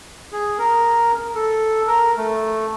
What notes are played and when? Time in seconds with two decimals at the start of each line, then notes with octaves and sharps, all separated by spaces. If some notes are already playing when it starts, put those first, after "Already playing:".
0.32 G#4
0.59 A#4
1.35 A4
1.87 A#4
2.18 A3